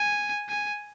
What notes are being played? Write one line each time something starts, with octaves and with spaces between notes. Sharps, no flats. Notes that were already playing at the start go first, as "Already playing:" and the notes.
Already playing: G#5
G#5